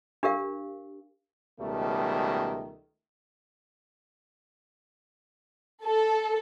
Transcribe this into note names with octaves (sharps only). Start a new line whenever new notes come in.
D4 G4 A#4 F5
C#2 B2 D#3 G3 A3
A4